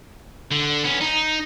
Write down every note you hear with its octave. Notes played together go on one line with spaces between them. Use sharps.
D3
B3 C#4
D#4